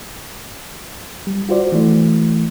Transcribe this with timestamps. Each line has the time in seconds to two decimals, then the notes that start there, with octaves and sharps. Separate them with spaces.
1.27 G3
1.49 F4 F#4 C5 D5
1.72 E3 A3